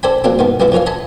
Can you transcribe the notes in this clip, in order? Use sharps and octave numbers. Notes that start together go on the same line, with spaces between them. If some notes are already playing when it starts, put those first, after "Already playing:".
A4 C5 D5 G5 G#5 B5
F#3 G3 A#3 C4 D4 G4
G2 D#3 B3
C2 B2 D3 B3 E4 F#4
F2 E3 A#4 C#5 F5
D#5 G#5 A5 B5